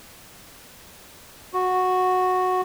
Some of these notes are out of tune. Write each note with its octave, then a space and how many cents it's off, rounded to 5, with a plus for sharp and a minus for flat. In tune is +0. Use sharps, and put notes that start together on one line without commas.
F#4 -10